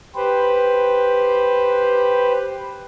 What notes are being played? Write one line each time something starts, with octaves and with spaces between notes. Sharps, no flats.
G4 B4 C5